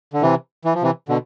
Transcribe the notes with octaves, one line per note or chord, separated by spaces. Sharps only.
D3
C3 E3
E3
F3
C3 E3
B2 D3